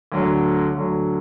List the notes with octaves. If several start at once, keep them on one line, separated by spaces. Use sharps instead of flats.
D2 D3 F#3
D2 D3 F#3